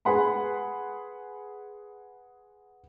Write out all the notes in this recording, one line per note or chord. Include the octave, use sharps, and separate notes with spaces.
G#4 B4 F#5 B5 C6